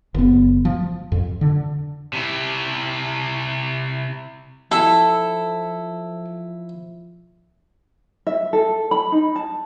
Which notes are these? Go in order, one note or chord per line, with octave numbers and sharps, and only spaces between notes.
F#1 B3
F3
F2
D3
C3 E4
F3 E4 A4
E5
A4
B5
D#4
A5